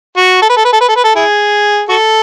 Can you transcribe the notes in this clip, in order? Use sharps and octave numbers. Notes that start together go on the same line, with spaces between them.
F#4
A4
B4
A4
B4
A4
B4
A4
B4
A4
E4 G#4
F#4 A4